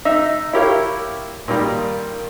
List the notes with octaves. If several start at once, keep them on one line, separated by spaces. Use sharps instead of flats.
D#4 E5
E4 F4 G4 A#4 C#5
A#2 D#3 G3